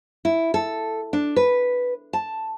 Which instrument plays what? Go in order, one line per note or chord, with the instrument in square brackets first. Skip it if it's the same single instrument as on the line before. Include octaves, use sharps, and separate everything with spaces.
[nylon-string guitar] E4
A4
D4
B4
A5